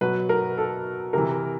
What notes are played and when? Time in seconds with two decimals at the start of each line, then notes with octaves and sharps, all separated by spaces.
0.01 B2 F#3 B4
0.29 A#4
0.58 A4
1.13 C3 E3 A#4